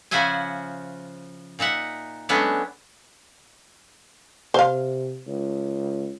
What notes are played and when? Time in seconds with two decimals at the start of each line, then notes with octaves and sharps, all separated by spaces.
0.11 C#3 F3 F#4 C5 E5 G#5
1.59 A#2 D#4 E5 F#5
2.29 F#3 G#3 A3 B3 C#4 D4
4.54 C3 C5 F5
5.27 C#2